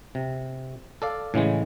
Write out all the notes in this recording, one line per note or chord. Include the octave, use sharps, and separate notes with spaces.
C3
A4 D5 F5
A2 C#3 E3 G#3